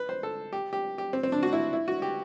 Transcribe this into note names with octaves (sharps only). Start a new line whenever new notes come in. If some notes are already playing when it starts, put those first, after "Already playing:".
Already playing: B4
C5
A4
G4
G4
G4
C4
C4
D4
F#4
E4
E4
F#4
G4